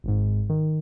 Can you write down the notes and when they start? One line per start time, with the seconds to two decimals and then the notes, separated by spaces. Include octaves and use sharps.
0.04 G#1 G#2
0.50 D#3